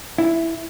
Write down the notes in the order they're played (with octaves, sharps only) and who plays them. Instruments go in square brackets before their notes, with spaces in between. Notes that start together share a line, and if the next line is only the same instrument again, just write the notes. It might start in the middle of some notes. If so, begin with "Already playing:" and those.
[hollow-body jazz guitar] E4